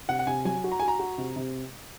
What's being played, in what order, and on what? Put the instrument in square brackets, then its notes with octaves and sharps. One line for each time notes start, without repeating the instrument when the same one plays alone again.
[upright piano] C3 [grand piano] F#5
[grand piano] F#5
[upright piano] C3 [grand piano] G#5
[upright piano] F#3 [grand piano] G#5
[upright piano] F#4
[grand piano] A#5
[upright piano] F#4 [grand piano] G#5
[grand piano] A#5
[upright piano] F#4
C3
C3